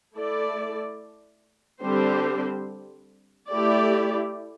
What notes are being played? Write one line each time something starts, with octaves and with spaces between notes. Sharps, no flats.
A3 E4 A4 D5
D3 G3 C4 G4 C5
A3 E4 G4 D5